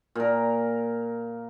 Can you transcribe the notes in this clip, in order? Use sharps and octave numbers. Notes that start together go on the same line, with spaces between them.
A#2 A#4